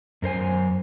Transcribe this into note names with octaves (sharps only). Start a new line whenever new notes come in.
F#2 A#4 C5 G#5